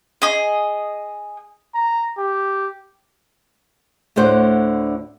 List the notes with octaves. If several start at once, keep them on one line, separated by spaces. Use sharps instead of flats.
G#4 D#5
A#5
G4
D2 A2 D3 C5 F#5